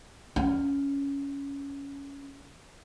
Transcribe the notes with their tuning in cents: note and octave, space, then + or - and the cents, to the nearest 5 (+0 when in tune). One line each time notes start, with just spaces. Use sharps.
C#4 +10